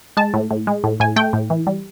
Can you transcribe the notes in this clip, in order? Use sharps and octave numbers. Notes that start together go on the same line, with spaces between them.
G#3 A5
A2
A2
G#3
A2
A2 G#5
A3 G5
A2
E3
G3